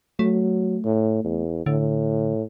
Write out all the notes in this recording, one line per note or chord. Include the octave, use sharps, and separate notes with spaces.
F#3 A3
A2
E2
A2 D3